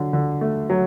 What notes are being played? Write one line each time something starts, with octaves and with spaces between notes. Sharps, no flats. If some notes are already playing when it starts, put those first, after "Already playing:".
Already playing: D3 F#3
D3
A3
F#3